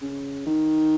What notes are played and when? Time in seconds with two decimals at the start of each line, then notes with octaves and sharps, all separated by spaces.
0.01 C#3
0.46 D#3